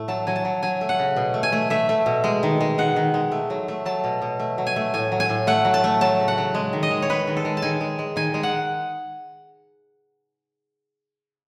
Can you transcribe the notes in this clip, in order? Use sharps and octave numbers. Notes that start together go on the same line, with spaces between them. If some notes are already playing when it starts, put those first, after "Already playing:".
Already playing: A2 A3
F#3 A5
F#3 G#5
A5
F#3
F#3 G#5
A3
F#5
C#3
B2
A3
G#5
A3
A3 E5
A3
B2
G#3
D#3
G#3
D#3 F#5
D#3
G#3
A3
F#3
A3
F#3 A5
B2
B2
A3
F#3
G#5
A3
A2 G#5
F#3
G#5
A2
A3 F#5
F#3
A5
A3
F#3 A5
C#3
F#5
F#3
G#3
D#3
D#5
G#3
C#5
G#3 B4
D#3
A4
G#3
A5
D#3 G#5
G#3
G#3
D#3 G#5
G#3
F#5